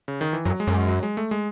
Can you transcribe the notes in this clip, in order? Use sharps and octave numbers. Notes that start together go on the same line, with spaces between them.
C#3
D#3
E3
F#2 F#3
G#3
F#2
G#3
F#3
G#3
A3
G#3